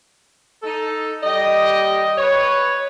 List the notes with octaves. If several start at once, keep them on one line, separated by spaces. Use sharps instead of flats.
D#4 A4
G3 G4 D#5
B4 C#5